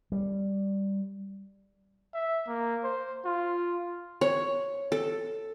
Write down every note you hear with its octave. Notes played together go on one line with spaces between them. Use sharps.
G3
E5
A#3
C5
F4
C#5
A4